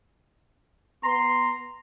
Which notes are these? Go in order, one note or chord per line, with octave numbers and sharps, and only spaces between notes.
B3 A#5 C6